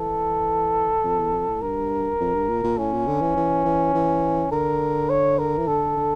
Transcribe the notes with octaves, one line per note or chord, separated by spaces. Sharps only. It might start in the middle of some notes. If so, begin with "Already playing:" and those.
Already playing: E3 A4
F2
E2
F2
A2
G2 A#4
F2
G2
A#2
A#2
A2 C#4
A#2
D3
E3
E3
E3
E3
D3 A#4
C#5
A#4
E3
D3 A4
D3